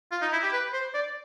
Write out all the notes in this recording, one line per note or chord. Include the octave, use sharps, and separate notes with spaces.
F4
D#4
E4
G4
B4
C5
D5